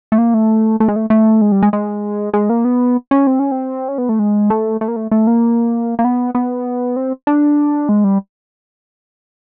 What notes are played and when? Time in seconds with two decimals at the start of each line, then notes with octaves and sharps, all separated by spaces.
0.12 A3
0.18 A#3
0.34 A3
0.80 A3
0.88 G#3
0.96 A3
1.10 A3
1.41 G#3
1.52 G3
1.63 G#3
1.73 G#3
2.33 G#3
2.50 A#3
2.65 B3
3.11 C#4
3.27 C4
3.39 C#4
3.51 C4
3.88 C#4
3.98 B3
4.09 A3
4.19 G#3
4.50 A3
4.81 A3
4.88 A#3
4.96 A3
5.11 A3
5.27 A#3
5.99 A#3
6.05 B3
6.35 B3
6.96 C4
7.27 D4
7.89 G#3
8.04 G3